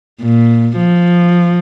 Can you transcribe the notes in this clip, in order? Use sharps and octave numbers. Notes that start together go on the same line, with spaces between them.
A#2
F3